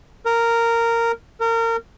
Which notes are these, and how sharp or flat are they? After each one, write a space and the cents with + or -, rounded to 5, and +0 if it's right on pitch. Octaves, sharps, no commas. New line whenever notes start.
A#4 -10
A#4 -30